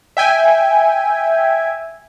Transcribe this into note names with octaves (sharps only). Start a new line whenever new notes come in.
E5 G5 G#5